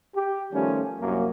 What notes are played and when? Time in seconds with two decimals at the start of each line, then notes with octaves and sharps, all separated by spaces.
0.14 G4
0.53 D#3 F3 G3 A3 C#4
1.00 C2 F#2 F#3 A#3